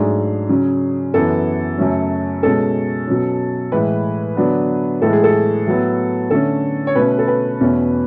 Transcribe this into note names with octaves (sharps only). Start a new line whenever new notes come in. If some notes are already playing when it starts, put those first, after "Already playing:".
Already playing: G#2 F#3 A3 D4 G#4
C#3 F#3 C#4
F#2 E3 B3 A4
F#2 C#3 F#3 A3 C#4
B2 G#3 C#4 A4
B2 F#3 C#4
A2 E3 G#3 B4
D3 F#3 B3 D4
A2 E3 G#3 A4
G#4
A4
A2 F#3 B3
D3 A3 C#4 A4
C#5
B2 A3 C#4 B4
A4
B4
E2 B2 A3 C#4